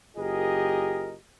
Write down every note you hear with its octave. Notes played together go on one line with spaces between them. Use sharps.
F#1 F4 G4 G#4 A#4 D#5